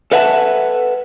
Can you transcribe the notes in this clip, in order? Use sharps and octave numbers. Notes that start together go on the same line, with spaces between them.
A4 B4 E5 F#5 G#5 A5